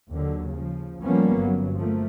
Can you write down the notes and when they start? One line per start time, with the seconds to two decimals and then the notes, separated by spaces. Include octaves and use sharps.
0.11 D#2 D3 F#3
0.50 C#3 F3
1.03 F3 G3 A#3 B3 C#4
1.37 G1 F#3
1.76 F3 A3 A#3